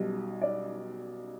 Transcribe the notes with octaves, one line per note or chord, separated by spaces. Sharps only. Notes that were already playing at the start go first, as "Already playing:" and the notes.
Already playing: B1 B2 G3
D5